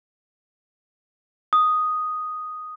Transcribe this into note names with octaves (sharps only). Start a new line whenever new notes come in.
D#6